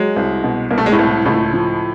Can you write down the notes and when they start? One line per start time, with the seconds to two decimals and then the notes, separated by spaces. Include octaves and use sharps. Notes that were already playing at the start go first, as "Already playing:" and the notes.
Already playing: F#3 G#3
0.16 C2
0.44 B2
0.71 C2 A#3
0.78 A3
0.86 G#3
0.92 A2 A3
0.99 C2
1.25 C#2 A2 A3
1.53 F3